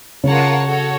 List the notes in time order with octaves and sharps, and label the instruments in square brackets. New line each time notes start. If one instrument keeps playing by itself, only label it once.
[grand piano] C#3 [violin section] F4 A#4 C#5 F#5 A5
[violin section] F#4 A4 C#5